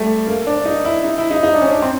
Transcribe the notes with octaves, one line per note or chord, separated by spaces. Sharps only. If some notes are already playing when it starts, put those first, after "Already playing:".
Already playing: G3 A3
A#3
D4
D#4
E4
D#4
E4
D#4
D#4
D4
C#4
D4
C4